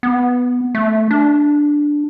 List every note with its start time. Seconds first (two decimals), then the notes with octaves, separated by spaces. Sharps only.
0.03 B3
0.75 A3
1.11 D4